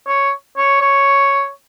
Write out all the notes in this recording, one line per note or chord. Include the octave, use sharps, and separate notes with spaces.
C#5
C#5
C#5